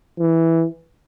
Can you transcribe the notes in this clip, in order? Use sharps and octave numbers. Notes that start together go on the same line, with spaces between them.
E3